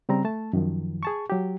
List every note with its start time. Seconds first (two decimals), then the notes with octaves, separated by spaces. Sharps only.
0.09 C#3 G3 C4 A#5
0.25 A3 A5
0.53 F#2 D#3 F3
1.03 G#4 A5 C#6
1.30 F#3 G4